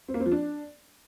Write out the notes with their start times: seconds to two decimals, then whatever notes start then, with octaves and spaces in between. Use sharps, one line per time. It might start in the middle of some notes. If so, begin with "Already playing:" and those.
0.08 C4
0.14 A#3
0.20 C4
0.26 F3
0.32 D4